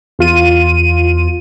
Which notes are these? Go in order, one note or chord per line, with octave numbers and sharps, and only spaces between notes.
E2 F4 D#7